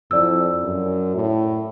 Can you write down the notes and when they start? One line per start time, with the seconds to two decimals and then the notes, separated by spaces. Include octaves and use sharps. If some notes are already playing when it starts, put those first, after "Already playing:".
0.11 F2 E4 D5 E6
0.64 F#2
1.15 A2